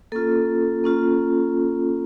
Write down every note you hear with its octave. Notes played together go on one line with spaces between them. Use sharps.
A#3 C#4 F4 A4
A#3 C#4 F4